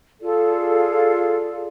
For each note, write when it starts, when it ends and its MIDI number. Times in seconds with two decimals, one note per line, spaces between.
0.21 1.68 65
0.21 1.68 68
0.21 1.68 69
0.21 1.68 74